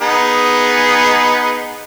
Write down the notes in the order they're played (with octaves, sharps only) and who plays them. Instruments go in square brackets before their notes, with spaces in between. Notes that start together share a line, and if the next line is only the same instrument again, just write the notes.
[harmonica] B3 D#4 G#4